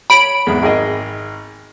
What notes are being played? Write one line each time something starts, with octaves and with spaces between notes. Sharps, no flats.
C#5 B5 D7
E2 G#2
G#1 G#4 D#5